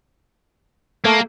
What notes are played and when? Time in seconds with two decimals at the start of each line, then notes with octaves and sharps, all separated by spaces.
1.05 A3 A#3